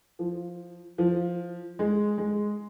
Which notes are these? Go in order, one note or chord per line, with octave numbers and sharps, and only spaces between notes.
F3
F3
G#3
G#3